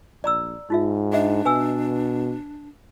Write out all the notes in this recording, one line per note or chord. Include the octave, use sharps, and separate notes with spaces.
A#1 D5 A#5 E6
G#2 D#4 F4 E5
D4 G#4 D#5 E5
B2 B4 G#5 E6